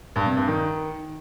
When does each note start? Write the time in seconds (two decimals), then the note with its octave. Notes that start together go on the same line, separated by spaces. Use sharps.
0.16 G2
0.26 C3
0.37 G2
0.48 D#3